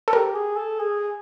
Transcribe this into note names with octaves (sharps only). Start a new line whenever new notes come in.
A4
G4 A#4
G#4
A4
G#4